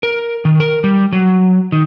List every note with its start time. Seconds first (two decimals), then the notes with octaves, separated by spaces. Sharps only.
0.03 A#4
0.45 D#3
0.60 A#4
0.84 G3
1.13 F#3
1.72 D#3